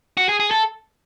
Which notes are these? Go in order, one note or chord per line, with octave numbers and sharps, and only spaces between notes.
F#4
G#4
G#4
A4